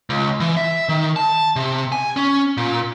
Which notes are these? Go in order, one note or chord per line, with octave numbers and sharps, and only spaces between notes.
C#2
E3
E5
D#3
A5
C3
G#5
C#4
A#2